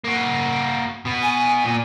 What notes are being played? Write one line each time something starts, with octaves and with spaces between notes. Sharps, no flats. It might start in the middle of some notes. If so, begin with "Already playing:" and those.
A#3 F#4
B2 B3
G#5
A#2